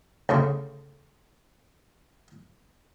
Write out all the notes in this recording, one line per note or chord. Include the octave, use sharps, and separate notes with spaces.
D2 C#3 C#6